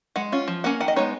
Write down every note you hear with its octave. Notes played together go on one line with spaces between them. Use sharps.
G#3 F#5
C#4 F4
F3
A#3 C#4 F#5
D#3 F#5
D#5
G#3 B3 D#4 C#5